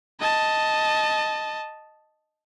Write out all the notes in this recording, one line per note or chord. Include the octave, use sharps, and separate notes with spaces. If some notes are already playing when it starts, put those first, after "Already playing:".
D#5 A5